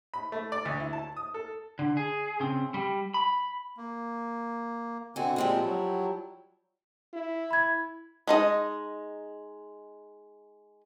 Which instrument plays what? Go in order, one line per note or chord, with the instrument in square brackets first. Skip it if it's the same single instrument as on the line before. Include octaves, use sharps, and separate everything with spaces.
[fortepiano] B5
A3
D5
D2
E4
A5
D#6
A4
[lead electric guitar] D3
G#4
C#3 C4
G3
B5
[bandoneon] A#3
[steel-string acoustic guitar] B2 F#4 [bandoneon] D3 C4 G#5
[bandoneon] A#2 G#3 C4 [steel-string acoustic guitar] F3 G3 E4
[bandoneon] F#3
[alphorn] E4
[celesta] B5 G#6
[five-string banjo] G#3 D#4 D#5